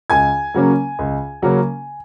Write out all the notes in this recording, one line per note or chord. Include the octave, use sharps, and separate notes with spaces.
C#2 G#5 G#6
C#3 F#3 A#3 C#4
C#2
C#3 F#3 A#3 C#4